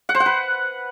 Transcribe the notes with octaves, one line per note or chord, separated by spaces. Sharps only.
F#5
C5
F#5
B4